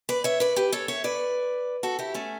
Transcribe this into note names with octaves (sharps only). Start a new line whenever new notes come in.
B4 D5
C#5 E5
B4 D5
G4 B4
A4 C#5
C#5 E5
B4 D5
F#4 A4
E4 G4
A3 C#4